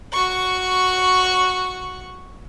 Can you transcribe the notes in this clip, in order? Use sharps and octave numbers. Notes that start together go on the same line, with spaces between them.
F#4 C#6